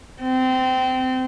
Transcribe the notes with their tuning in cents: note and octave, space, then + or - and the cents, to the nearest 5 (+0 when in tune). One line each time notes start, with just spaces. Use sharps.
C4 -25